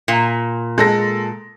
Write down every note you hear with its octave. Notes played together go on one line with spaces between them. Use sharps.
A#2
G#3 A4 A#6